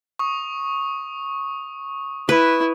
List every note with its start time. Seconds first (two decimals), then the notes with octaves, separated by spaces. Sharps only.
0.19 C#6 D#6
2.29 E4 B4